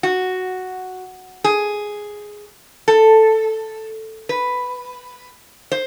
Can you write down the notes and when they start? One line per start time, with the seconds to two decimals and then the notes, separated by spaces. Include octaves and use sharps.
0.03 F#4
1.44 G#4
2.88 A4
4.29 B4
5.71 C5